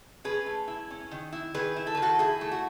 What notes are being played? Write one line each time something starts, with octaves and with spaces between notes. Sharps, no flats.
C#4 G#4 B4
A3
E4
C#4
D#3
E4
D#3 G#4 B4
E4
A4
D#3 B4
F#4 A4
E4 G#4
A3
F#4